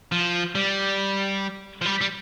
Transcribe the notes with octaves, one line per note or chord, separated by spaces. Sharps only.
F3
G3
F3
G3
G3